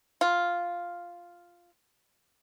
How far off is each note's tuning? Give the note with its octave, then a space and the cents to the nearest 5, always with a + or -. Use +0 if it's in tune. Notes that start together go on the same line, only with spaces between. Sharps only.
F4 +0